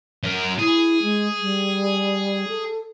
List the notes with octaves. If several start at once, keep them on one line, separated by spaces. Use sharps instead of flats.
F#2 A#4
E4 G#4
G#3
G3
A4